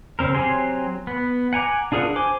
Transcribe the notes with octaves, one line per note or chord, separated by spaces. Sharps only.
C#3 C4 A#4
F#3 C4 G4 G#5 C6
B3
F#5 G#5 A#5 D6
D4 F4 G#4 A#4 F#5
C5 G#5 D6